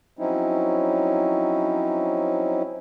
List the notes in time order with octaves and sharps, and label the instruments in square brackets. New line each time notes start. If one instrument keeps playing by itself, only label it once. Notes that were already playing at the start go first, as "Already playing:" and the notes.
[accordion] F3 F#3 C4 C#4 D#4 E4